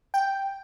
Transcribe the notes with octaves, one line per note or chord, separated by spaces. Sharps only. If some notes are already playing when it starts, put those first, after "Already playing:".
G5